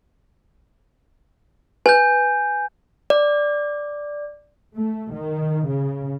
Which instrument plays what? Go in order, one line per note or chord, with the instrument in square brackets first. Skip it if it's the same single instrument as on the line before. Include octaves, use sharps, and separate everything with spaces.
[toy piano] B4 [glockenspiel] G#5 G6
[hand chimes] D5
[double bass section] A3
D#3
C#3